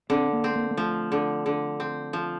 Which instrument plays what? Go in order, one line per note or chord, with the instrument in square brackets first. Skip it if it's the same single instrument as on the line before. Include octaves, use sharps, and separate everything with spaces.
[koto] D3 [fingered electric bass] C4
[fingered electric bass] A#3
[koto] C4
[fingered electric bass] A#3
A#3
[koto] F3 [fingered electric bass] A3
[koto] D3
D3
C4
F3